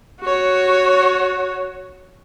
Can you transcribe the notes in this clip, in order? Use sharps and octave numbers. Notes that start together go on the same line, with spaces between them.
F#4 C#5